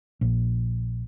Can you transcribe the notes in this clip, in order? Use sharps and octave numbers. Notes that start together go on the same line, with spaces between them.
A#1